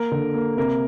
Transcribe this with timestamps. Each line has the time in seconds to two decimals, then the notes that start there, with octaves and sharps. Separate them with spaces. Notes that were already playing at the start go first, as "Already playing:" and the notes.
Already playing: A#3 A#4
0.12 D3
0.34 A#3
0.57 C3 A#4